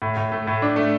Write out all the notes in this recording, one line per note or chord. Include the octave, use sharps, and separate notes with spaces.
A2
A2
A3
A2
D4
A3